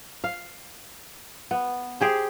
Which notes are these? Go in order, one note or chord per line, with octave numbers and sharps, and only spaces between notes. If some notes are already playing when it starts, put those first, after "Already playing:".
F5
B3
G4 G#4 C5